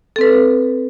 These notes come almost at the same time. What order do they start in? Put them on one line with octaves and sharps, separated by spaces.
A4 C4 B4